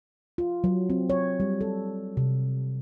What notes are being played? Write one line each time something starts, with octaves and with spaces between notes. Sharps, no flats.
F4
F#3
C4
C#5
G3
A4
C3